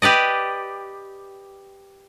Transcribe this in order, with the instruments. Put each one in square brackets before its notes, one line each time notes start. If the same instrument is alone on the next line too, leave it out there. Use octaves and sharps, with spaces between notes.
[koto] G4 B4 D5 D#5